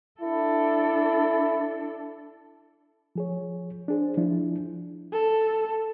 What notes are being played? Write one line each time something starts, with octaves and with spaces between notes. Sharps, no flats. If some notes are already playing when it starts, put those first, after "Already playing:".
D4 E4 A4
F3 G#4 C#5
D4 G#4 C5
F3 D4 E4
A4